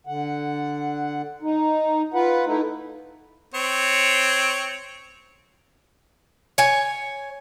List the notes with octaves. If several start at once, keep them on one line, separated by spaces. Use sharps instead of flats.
D3 F#5
D#4
F4 B4 F#5
A3 D#4 E4
C4 C#5
C#5 G#5